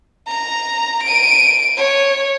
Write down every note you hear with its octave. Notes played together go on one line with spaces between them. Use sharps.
A#5
D7 D#7
C#5